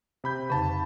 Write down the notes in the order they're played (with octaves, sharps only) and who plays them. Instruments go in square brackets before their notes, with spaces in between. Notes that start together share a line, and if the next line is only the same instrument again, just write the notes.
[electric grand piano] C3 B5 G6
[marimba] F2 C#3 [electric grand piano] A5 B5